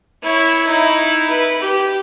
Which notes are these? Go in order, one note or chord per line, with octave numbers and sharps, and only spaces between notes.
E4 C#5
D#4 E4
B4
G4